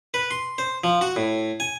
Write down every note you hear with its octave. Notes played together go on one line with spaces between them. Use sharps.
B4
C6
C5
F3
F#4
A2
G#5